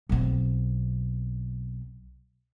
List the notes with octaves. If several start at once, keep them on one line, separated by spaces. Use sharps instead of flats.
B1 C4